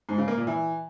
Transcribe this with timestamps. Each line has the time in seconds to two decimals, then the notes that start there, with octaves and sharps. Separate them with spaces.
0.09 G#2
0.18 C#3
0.28 A#3
0.37 A#2
0.47 E3